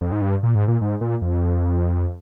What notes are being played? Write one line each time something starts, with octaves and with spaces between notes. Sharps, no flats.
F2
G#2
G2
A#2
G#2
A#2
G#2
A#2
F2